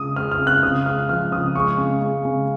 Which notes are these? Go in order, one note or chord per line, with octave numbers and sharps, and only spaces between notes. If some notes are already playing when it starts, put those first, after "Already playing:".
Already playing: C#3 G#3 D#6
G#3 F6
F6
C#3
F#6
C#3 D#6
G#3 F6
F3 F6
C#3 D#6
G#3 C#6
C#3
G#3
C#3